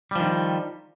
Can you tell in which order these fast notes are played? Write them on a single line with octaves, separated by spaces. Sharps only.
G3 F3 D#3